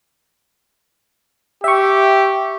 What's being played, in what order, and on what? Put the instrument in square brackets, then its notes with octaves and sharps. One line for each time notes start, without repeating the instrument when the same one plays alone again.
[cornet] G4 [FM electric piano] E5 C#6